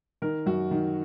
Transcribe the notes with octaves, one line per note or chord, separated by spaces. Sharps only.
D#3 A#4
F#2 F#4
D#3